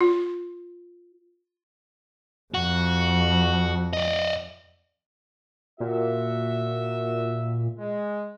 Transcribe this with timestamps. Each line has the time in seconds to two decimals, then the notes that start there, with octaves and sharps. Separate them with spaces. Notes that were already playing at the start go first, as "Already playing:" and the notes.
0.01 F4
2.54 F2 F#4
3.93 D5 D#5
5.80 A#2 F#4 E5
7.78 G#3